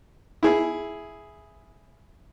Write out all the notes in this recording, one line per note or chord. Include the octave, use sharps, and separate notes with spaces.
E4 G#4